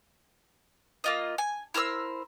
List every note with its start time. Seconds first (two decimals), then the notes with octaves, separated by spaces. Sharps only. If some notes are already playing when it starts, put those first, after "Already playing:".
1.04 A#3 F4 D#5
1.38 G#5
1.74 E4 A#4 C5 E6